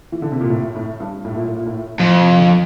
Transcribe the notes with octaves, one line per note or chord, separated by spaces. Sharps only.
E3
D3
C3
A#2
A2
A2
G2
A2
A#2
A2
A#2
A2
F2 A2
C3
D3